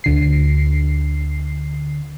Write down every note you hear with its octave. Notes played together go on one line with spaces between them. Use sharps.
D2 D3 C7